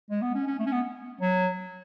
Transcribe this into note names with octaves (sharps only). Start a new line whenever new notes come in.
G#3
B3
C#4
C#4
A3
C#4
B3
F#3